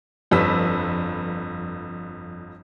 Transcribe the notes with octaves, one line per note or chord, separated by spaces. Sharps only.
G1 F2 G3 B4 E6 B6